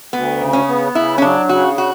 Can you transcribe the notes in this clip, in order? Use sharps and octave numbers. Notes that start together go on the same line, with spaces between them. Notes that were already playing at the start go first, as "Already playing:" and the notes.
D2 B3
C#3
C#4
B3
C#3 E4
C#4
F#3 D4
C#3 F#4
F#4